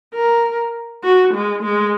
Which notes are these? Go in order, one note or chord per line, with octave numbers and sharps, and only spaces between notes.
A#4
F#4
G#3
G#3